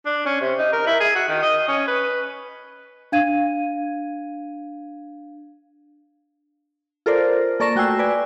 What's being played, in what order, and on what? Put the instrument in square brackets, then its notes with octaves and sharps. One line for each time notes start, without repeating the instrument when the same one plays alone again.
[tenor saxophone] D4
C#4
C3
D#4
A#4
E4
G#4
F#4
D#3
D#5
C#4
B4
[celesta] D4 F5 G#6 D#7
[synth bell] F4 A4 A#4 C5 D5
A#3 A4 D5 C#6 A#6 E7
A3 F#4 G5 G#5 E6 C7
B4 D5 G#5